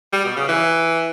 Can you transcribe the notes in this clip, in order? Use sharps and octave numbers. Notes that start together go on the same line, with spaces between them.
G3
B2
C#3
E3